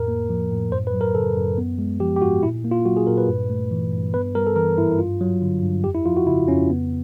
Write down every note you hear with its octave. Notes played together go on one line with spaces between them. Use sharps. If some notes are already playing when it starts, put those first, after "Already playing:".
Already playing: F2 A2 A#4
A#3
F3
A2
F#2 C5
B4
F#3
A#4
C#3 A4
F#2
B3
G#3
F3 G4
G4
G#2 F#4
A#2 E4
A#3
F4
F#3 F#4
G#4
A#2 A#4
B4
G2
A3
E3
G2
B3 B4
G3 A#4
A4
E3 A#4
G#2 E4
E4
G2 F4
F#3
D3
G2
F2 G4
E4
F3 F4
F#4
C#3 E4
F2 C#4
B3